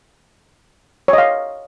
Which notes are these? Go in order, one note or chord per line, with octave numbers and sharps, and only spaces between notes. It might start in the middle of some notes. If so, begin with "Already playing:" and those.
C#5 D#5 F5